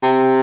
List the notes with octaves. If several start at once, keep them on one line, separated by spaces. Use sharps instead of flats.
C3